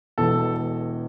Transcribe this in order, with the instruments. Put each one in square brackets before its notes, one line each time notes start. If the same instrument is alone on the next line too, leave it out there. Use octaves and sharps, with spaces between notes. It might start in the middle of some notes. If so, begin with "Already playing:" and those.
[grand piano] E1 E2 B2 A4